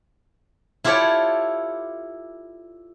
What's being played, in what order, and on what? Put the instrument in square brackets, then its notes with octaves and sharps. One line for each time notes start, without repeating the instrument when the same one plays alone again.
[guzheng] E4 F4 G4 A4 C#5 D5